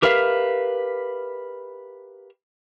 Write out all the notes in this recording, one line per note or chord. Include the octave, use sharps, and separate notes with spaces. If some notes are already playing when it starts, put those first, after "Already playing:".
G4 A#4 B4 E5 F5